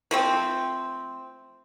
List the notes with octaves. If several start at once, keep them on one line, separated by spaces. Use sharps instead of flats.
F3 A3 C4